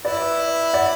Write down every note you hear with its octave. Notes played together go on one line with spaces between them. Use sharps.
E4 B4 D5
D5 F#5